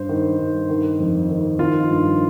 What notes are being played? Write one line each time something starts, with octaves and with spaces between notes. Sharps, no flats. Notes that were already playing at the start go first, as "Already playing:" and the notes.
Already playing: G2 C5
D#3
G2
D#3
F2
D#3
D#3 F4
G2